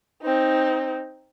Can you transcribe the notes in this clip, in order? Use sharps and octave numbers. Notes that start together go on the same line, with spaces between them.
C4 D#4